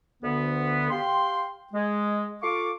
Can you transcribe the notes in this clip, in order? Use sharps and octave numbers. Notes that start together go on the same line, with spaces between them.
D2 D3 B3
G4 F5 G5 C6
G#3
F4 A4 F5 C#6 D6